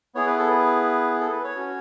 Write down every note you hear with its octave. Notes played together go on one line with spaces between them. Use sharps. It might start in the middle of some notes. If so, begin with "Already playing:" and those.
B3 E4 G#4 C#5
B4
A4
B4
A4
B4
C#5
C#4 F#4